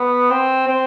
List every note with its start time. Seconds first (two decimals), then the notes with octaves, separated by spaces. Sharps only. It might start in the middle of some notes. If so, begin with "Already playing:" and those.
Already playing: B3
0.31 C4
0.68 C4